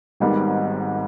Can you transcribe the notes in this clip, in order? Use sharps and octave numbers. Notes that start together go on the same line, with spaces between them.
G#1 G#2 D#3 G3 B3